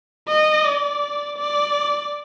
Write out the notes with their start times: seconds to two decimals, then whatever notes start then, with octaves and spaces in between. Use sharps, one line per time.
0.29 D#5
0.65 D5
1.38 D5